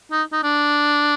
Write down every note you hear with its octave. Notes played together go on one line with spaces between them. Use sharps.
D#4
D#4
D4